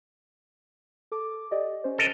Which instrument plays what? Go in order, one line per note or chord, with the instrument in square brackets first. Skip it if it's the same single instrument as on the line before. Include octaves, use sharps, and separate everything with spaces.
[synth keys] A4 D6
G4 D5 D#5
C#4 C5
[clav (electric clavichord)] A4 A#4 D#5